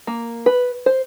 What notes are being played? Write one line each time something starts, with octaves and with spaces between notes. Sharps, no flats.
A#3
B4
C5